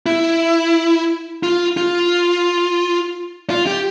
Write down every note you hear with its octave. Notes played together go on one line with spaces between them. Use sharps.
E4
F4
F4
F4
G4